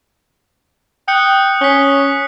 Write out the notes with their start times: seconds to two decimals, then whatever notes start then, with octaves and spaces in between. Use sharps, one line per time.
1.08 G5 D#6 F#6 C#7
1.61 C#4 B6 G7